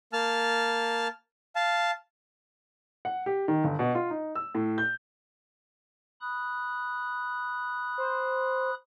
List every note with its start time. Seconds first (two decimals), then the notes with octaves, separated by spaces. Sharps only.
0.13 A#3 A5 F6
1.56 F5 A5
3.05 F#5
3.26 G4
3.48 D#3
3.64 G1
3.79 B2
3.95 F4
4.10 D#4
4.35 E6
4.55 A2
4.78 G6
6.21 B5 D#6 F#6
7.98 C5